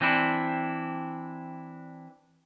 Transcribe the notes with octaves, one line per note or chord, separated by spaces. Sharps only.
E3 C4 D4 E4